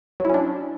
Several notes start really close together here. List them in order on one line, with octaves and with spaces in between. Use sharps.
F#3 E4 C#4 D4